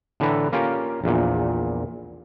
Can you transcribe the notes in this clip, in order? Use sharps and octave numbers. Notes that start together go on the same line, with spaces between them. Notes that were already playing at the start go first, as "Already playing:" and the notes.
A2 D3 E3 A4 B4 A#5
A#3 C#4 F4 G4 A#4
A#1 E2 A#2